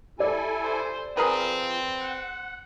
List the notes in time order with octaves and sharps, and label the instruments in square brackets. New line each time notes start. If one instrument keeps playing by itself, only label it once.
[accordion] E4 A4 G#5 [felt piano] G4 D5
[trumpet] C5
[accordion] F3 [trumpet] C4 [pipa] G#4 A#4 B4
[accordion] F#5